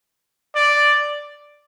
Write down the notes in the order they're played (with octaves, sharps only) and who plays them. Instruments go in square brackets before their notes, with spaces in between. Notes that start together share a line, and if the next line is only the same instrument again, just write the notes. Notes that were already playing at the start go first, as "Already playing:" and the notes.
[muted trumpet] D5